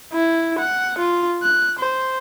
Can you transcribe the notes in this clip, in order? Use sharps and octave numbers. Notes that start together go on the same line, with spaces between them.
E4
F#5
F4
F#6
C5